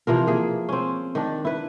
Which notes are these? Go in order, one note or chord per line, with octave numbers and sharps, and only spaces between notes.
C3 E3 F3 A#4
A#3 G#4
C4 C#4
D#3 D4
E4 B4